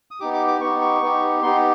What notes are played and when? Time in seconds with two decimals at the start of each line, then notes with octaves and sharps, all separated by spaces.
0.11 D#6
0.20 B3 D#4 G4 D6
0.33 D6
0.48 D6
0.60 B3 D#4 G4 C#6
0.81 C#6
1.02 B3 D#4 G4
1.42 B3 D#4 G4 C6